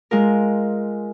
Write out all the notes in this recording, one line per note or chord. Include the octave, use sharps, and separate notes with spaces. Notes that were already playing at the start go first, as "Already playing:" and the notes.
G#3 F4 A#4